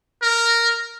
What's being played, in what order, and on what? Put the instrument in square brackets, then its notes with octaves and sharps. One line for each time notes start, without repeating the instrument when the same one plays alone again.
[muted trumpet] A#4